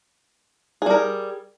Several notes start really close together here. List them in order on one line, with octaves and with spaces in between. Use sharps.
G#4 G3 A#4